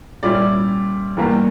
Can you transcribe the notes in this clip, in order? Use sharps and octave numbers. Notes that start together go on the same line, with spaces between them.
A#2 G3 C#4 E4 D5
E2 E3 G3 A#3